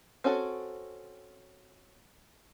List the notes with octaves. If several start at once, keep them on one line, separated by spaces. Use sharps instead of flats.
C4 C#4 F#4 A4